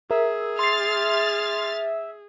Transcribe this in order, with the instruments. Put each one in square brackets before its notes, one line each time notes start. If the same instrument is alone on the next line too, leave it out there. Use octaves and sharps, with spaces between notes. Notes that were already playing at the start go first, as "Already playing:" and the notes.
[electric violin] G#4 [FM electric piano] A#4 [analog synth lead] E5
[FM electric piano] C6 C7 [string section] F6 A6